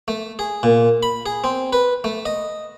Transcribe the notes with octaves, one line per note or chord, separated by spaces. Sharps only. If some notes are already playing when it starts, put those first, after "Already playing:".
A3
G#4
A#2
B5
G#4
C4
B4
A3
D#5